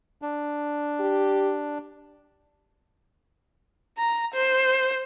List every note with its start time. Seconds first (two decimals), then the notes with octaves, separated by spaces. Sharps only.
0.22 D4
1.00 G4
3.98 A#5
4.34 C5